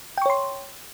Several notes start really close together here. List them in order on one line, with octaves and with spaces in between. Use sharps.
G5 C#6 C#5 C6